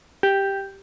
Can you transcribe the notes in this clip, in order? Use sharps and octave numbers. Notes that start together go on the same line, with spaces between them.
G4